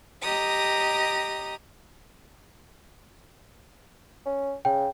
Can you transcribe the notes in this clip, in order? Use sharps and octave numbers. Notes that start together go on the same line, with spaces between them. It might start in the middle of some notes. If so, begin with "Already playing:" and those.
G4 D#5 A#5 D#6
C#4
C#3 G5